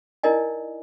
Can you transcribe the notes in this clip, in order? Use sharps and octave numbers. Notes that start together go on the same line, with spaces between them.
D#4 E4 A#4 D5 D#5 G#5